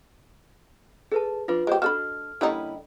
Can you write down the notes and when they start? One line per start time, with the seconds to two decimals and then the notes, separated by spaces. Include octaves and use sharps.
1.12 G#4 A4 B4 A5
1.48 F3 D4 F4 B4
1.67 G#3 G4 A#4 C5
1.82 D4 F#4 A4 D#5 B5 F6
2.41 D3 G3 A#3 C#4 D#4 E4